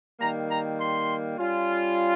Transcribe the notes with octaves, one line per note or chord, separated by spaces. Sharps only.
D#3 G3 A#3 A#5
A#5
C6
G3 C#4 F4